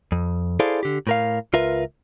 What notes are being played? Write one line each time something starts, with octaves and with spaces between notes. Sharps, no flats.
F2
E4 G#4 A4 C5 D5 F5
D3 G4
A2 A#4 F5
C#2 F4 A#4 B4 E5